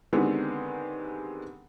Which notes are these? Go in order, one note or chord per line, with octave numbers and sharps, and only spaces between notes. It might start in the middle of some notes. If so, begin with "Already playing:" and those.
D3 D#3 G#3 B3 C4 G4